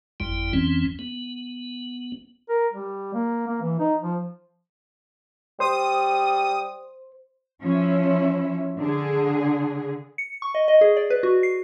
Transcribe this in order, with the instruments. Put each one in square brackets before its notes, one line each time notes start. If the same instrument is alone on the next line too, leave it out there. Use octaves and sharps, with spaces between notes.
[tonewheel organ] G1 F2 G3 E4
F2 E3 C4 C#4
B3
[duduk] A#4
G3
A#3
A#3
E3
D#4
F3
[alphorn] G3 [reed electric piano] C5 [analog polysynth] D#6
[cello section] F3 C#4 E4 E5
D3 G#4
[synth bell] C#7
C#6
D#5
D#5
G#4
D5
B4
F#4
C7